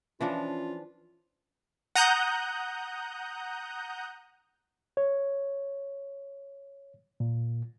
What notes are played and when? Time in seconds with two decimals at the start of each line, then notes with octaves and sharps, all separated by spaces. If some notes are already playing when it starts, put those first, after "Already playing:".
0.21 E3 F3 C#4 D4 F4
1.95 F#5 A#5 D#6 F#6 G6
4.97 C#5
7.20 A#2